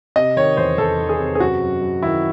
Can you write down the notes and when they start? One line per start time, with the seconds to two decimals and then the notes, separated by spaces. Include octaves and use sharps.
0.16 C3 D#5
0.37 D#3 C#5
0.57 E2 C5
0.78 E2 A4
0.99 D#3
1.09 G#4
1.19 C3
1.35 G#4
1.40 F#2 F#4
1.61 F#2
1.82 F#2
2.02 D#3 E4